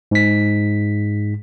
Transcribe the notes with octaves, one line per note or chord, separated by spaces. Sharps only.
G#2 B6